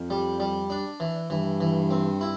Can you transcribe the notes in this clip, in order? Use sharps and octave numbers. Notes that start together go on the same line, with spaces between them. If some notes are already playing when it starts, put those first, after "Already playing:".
Already playing: F2
G3
G3
D4
E3
G2 E3
E3
C4
E4